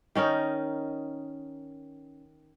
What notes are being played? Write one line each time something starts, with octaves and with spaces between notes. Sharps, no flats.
D#3 C#4 D#4 A#4